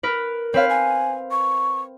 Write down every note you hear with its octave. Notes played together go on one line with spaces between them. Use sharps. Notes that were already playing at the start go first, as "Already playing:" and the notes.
A#4 B4
C4 B4 C#5 F5
G#5
C#6